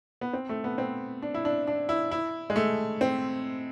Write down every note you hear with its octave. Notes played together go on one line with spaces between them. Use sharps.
B3
C4
A3
B3
C4
D4
E4
D4
D4
E4
E4
G#3
A3
C4